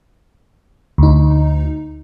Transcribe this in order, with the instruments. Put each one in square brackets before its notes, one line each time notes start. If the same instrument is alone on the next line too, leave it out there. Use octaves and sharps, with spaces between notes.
[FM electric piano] D2 D#4